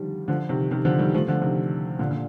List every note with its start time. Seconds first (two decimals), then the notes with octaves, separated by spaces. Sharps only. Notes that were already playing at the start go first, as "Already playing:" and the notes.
Already playing: D3 D#3 F3 G3
0.28 D3 F3
0.49 C3 D#3
0.71 C3 D#3
0.85 D3 F3
0.99 D#3 G3
1.14 F3 A3
1.28 D3 F3
1.42 C3 D#3
1.99 A#2 D3
2.09 A#2 D3